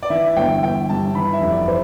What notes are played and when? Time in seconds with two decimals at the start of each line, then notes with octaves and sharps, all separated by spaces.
0.02 D5
0.10 E3 E5
0.36 G1 G5
0.63 G1 G5
0.89 G2 A5
1.15 E3 B5
1.33 E5
1.42 F1
1.51 D5
1.68 C5